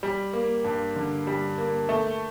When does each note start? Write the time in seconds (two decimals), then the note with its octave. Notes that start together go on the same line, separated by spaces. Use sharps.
0.03 G3
0.33 A#3
0.64 G2
0.96 D3
1.27 G3
1.58 A#3
1.89 A3